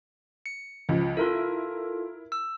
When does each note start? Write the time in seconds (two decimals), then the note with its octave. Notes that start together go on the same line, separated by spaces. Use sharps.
0.46 C#7
0.89 C#2 F3
1.17 E4 F4 A4 A#4
2.32 E6